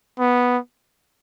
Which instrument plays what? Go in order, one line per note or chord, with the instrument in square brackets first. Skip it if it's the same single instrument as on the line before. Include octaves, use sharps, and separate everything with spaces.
[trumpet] B3